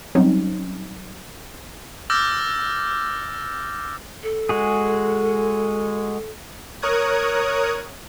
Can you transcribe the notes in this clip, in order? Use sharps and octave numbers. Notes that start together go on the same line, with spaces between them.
F#3 G3 C4 C#4 D#4
D6 E6 F6 G6 A6 A#6
A4
G#3 F#4 G#4
A#4 C#5 D#6 F#6 G#6